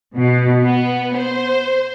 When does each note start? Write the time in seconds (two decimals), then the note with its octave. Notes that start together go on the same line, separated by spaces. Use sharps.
0.15 B2
0.63 B3
1.17 C5